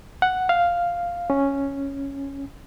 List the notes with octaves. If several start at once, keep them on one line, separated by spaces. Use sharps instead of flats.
F#5
F5
C#4